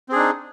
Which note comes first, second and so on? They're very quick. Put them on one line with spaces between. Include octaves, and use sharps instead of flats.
C4 G#4 D4 D#4